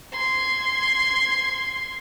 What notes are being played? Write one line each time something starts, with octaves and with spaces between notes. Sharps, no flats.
C6 G#6